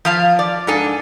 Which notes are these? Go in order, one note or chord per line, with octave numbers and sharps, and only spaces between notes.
F3 F5 A5
D5
G#2 D4 A4 G#5